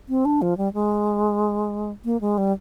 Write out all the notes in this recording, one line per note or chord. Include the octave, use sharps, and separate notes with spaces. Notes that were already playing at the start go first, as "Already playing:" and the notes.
C4
D4
F3
G3
G#3
A#3
G#3
G3